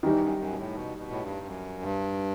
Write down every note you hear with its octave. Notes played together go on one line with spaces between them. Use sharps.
D#3 E3 G3 D#4
F#2
F#2
B2
A2
B2
B2
A2
G2
F#2
G2